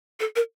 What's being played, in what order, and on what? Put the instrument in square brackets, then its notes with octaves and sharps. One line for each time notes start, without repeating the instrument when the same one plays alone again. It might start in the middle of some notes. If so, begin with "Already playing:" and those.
[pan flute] A4
A#4